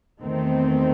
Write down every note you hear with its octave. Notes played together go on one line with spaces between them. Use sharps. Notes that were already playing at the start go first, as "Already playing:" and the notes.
E2 D#3 A3 C4